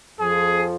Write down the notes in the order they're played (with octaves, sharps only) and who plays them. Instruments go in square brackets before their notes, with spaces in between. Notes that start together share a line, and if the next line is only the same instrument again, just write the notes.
[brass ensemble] F2 F3 G#4